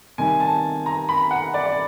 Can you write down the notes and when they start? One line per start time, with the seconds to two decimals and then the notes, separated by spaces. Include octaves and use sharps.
0.18 C3 D#3 G3 G#5
0.40 A5
0.86 A#5
1.09 B5
1.31 F#5
1.54 D5
1.66 D5